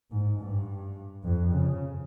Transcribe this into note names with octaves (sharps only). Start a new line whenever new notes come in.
G#2
G2
F2
C#3